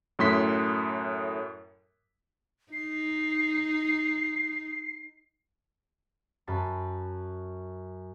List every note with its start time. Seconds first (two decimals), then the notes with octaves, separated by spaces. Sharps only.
0.19 F#2 A2 C6 B6
2.73 D#4 C7
6.47 F#2 A5 B5